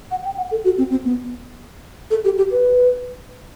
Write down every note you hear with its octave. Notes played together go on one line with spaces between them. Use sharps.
F#5
G5
F#5
A4
F#4
C4
C4
B3
A4
G4
G4
B4